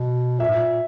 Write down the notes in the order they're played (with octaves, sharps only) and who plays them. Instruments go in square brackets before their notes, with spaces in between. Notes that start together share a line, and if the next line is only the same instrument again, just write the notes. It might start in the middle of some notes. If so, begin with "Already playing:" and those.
Already playing: [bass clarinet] B2
[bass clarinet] A#2 [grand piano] E5
[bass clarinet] G#2
A#2